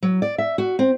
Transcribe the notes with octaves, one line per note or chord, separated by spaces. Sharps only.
F#3
D5
E5
F#4
C4